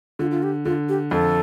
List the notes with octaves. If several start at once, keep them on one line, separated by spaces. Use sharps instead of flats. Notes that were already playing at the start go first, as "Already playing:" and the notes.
D3 F4
F4
G4
D3 F4
G4
F2 A4